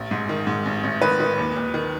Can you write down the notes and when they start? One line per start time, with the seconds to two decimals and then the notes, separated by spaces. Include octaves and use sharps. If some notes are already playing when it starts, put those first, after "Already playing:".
Already playing: A1
0.11 G#2
0.29 D#3
0.47 G#2
0.66 A1
0.83 A1
1.01 D#3 B4
1.20 D#3
1.38 D#2
1.56 D#2
1.74 D#3